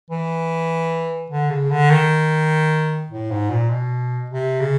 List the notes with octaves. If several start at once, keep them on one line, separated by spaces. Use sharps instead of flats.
E3
D3
C#3
D3
D#3
A2
G#2
A#2
B2
C3
C#3